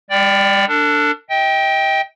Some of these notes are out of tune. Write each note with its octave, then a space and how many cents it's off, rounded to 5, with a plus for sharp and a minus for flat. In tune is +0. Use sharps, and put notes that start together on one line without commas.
G3 +45 D5 +0 G5 -5
D4 +0 A4 +40
D#5 +40 G5 +0